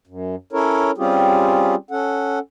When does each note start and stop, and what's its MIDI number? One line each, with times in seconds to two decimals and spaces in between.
0.07 0.35 42
0.53 0.91 61
0.53 0.91 64
0.53 0.91 69
0.53 0.91 70
0.53 0.91 73
0.98 1.75 55
0.98 1.75 60
0.98 1.75 61
0.98 1.75 65
0.98 1.75 67
0.98 1.75 68
1.91 2.39 61
1.91 2.39 69
1.91 2.39 78